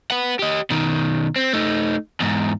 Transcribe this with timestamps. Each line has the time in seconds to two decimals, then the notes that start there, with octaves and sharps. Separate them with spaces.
0.11 B4 F#5
0.39 G4 D#5
0.70 B2 D#3
1.36 C4
1.53 A3 D#4
2.20 E2 G#2